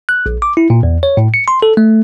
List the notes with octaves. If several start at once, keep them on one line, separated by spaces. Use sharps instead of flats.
F#6
A#1
D6
E4
A#2
E2
C#5
A2
C#7
C6
A4
A3